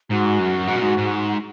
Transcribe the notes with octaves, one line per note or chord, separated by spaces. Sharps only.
G#2 F#4
F#2
G#2
A#2
G#2
G#2